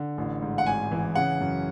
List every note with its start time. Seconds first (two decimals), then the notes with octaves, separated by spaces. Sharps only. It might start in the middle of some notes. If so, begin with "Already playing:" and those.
Already playing: D3
0.18 A1
0.42 G#2
0.58 F#5
0.66 G#1 G#5
0.91 E3
1.15 C#3 F#5
1.40 F#2